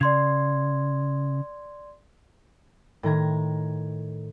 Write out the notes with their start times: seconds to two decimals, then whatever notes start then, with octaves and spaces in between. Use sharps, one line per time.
0.01 C#3 D5 C6 G#6
3.03 A2 D#3 A#5 G#6